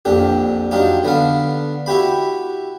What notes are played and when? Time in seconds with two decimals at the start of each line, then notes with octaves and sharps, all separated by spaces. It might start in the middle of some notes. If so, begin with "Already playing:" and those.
0.05 A#1 F2 D4 G4
0.71 F#3 D4 D#4 F4 G4
1.03 D3 B3 D4 F5
1.86 E4 F#4 G4 B5